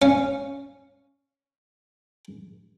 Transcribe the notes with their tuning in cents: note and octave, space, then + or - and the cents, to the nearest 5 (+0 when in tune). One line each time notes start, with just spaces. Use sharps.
C#4 +0 F5 -15